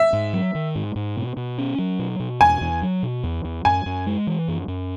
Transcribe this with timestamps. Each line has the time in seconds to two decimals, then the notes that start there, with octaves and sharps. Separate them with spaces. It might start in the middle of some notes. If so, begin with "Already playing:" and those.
Already playing: E5
0.13 G#2
0.33 F#3
0.55 D#3
0.75 G#2
0.96 G#2
1.16 B2
1.37 B2
1.58 C#4
1.78 F#3
1.99 B2
2.20 B2
2.41 E2 G#5
2.61 E2
2.82 F#3
3.03 B2
3.23 E2
3.45 E2
3.65 F#2 G#5
3.86 F#2
4.07 G#3
4.27 E3
4.48 F#2
4.68 F#2